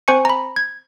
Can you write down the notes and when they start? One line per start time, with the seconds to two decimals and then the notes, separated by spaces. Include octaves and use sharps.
0.08 C4 C5 G#5 C#6 C#7
0.25 A#5 B5
0.56 G#6